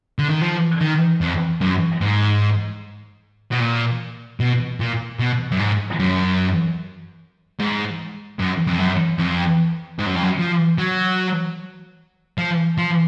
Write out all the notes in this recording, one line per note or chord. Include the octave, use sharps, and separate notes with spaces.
D3
D#3
F3
D#3
F2
F#2
G#2
B2
A#2
B2
A#2
B2
F#2
G#2
F#2
G#2
F#2
F2
F#2
F2
G#2
F#2
F2
F#2
F3
F#3
F3
F3